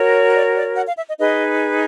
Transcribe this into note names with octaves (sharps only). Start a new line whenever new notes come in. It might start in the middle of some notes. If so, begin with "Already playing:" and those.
Already playing: F#4 A#4 C#5
D5
D5
F#5
F5
E5
D#5
D#4 G#4 B4 D#5